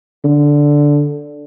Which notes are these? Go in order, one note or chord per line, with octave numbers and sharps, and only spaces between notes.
D3